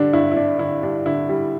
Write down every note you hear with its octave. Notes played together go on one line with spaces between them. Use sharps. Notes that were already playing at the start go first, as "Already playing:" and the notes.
Already playing: D3 G3 D4
G2 E4
E4
D3 D4
D3 E4
G3 D4
D3 E4
G3